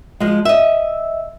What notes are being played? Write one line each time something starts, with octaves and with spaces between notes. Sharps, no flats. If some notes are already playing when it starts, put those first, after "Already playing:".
F3 G#3
D#5 E5